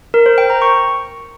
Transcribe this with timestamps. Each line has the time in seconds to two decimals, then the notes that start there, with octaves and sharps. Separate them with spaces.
0.14 A#4
0.26 C5
0.38 G5
0.50 A#5
0.62 C#6